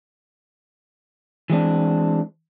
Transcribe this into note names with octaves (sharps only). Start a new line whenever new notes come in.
E3 G#3 C4 D4